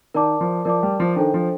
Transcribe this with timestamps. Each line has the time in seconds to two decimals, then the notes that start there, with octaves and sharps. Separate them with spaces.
0.14 D#3 A#4 D5 A5 D6
0.41 F3
0.65 F3 A#4 D5 A5 D6
0.83 G3
1.00 F3
1.16 D#3 D4 A4 C5 D#5 G5
1.34 F3